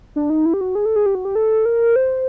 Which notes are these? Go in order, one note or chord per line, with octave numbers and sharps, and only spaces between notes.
D4
D#4
E4
G4
F#4
G#4
A4
G#4
G4
F#4
G4
A4
A#4
C5